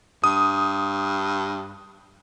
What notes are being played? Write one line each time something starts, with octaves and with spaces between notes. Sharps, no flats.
G2 D#6